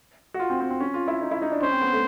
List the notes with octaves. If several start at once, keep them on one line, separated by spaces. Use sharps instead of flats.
F#4
F4
C4
C4
C4
C#4
F4
E4
D#4
E4
D#4
D4
C#4 C5
C4
B3
A3